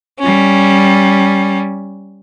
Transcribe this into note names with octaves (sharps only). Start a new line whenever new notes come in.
G3 C#4